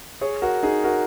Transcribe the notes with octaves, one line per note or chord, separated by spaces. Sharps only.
G#4 C#5
F#4 A#4
D#4 G#4
F#4 A#4